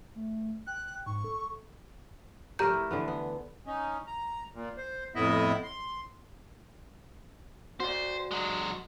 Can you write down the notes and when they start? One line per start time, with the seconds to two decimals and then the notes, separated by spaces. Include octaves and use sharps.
0.15 A3
0.67 G5 F#6
1.06 G#2 C#6
1.24 A4
2.59 A3 G4 A#4 D5 A#5 G6
2.73 E4
2.91 D3 E3 B3
3.08 B3
3.66 C#4 D#4
4.07 A#5
4.54 A#2
4.77 C5
5.15 F2 A2 B3 E4 D#5 E5
5.63 C6
7.80 F#4 C5 D5
8.31 F#3 G#3